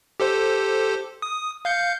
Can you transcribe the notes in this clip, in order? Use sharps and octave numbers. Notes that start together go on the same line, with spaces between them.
G4 A4 C5
D#6
F5 G6 C#7